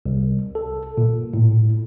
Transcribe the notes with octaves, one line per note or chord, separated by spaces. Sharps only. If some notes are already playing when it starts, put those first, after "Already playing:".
C2
A4
A#2
A2